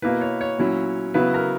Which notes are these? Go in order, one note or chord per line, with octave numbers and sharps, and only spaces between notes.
B2 A#3 E4 B4
C#5
C#5
A#2 F#3 C#4 E4
C#3 F#3 B3 E4 B4
A#4